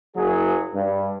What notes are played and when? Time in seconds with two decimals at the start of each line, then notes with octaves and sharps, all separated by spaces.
0.16 F#1 F#3 G#4
0.74 G2